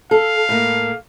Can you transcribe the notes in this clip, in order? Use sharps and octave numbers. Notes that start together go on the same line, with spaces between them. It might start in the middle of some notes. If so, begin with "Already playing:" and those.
A4 F5
A2 A#3